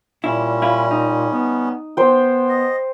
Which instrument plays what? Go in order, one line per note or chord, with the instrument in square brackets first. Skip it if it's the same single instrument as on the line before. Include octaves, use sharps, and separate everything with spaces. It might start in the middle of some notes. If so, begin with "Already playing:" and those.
[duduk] A#2 [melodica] G3 C#4 [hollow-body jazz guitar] E4
[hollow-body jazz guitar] E4 F4
D#4
[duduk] B3
[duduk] B3 [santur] C5 G5
[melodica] D#5